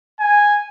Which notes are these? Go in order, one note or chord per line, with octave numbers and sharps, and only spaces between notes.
G#5